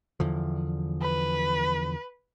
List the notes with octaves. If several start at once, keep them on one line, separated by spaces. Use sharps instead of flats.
E2 D3 F3
B4